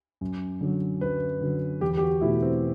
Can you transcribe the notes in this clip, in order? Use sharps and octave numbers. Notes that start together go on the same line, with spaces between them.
F#2
D3 F#3
F#2 B4
D3 F#3
E2 G4
G4
F#4
B2 A3 E4
C4